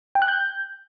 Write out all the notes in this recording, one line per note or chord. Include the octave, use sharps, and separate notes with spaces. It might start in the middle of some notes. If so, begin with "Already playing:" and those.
G5
F#6
G6